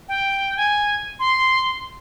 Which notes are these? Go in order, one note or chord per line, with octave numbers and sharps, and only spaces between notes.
G5
G#5
C6